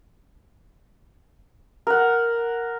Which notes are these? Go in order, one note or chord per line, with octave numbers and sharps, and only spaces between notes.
A#4 F#5